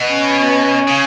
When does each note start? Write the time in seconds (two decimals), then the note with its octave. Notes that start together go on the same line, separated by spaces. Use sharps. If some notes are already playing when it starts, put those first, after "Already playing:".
Already playing: B2
0.10 C#4
0.87 C#3